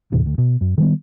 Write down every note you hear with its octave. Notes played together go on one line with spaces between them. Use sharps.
D#2 A2 C3 E3
D2
B2
F#2
D#3 G3 B3